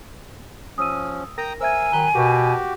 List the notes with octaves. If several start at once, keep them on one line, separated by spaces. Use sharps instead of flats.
F3 C#4 D#6 E6 D#7
A#4 G5 A#5 D#6 A#6
A#4 C5 E5 G#5 E6 G#6
D#3 F#3 A#5 B5 F#6 G7
B2 F#4 G4 A#4 B4 C#6